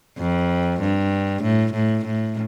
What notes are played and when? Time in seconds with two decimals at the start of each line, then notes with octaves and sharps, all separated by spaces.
0.18 F2
0.81 G2
1.43 A2
1.74 A2
2.05 A2